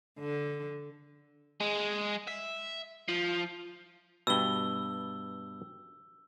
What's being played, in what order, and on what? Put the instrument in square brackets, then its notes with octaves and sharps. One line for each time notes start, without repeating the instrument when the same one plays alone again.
[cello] D3
[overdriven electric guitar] G#3
E5
F3
[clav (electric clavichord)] G2 B2 [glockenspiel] E6 G7